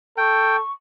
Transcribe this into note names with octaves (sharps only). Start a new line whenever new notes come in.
A4 G5 C#6